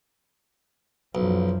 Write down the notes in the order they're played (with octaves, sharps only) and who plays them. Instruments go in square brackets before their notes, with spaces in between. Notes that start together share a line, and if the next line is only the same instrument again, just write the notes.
[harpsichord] B1 [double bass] F#2 F3